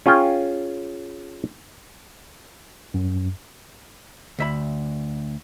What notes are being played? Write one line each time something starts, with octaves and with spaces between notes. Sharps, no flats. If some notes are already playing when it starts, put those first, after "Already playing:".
C#4 F4 G#4 G5
F#2
D2 E5 B5